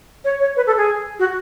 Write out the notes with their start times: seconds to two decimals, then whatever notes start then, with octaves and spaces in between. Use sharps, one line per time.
0.24 C#5
0.40 C#5
0.56 B4
0.67 A4
0.77 G#4
1.19 F#4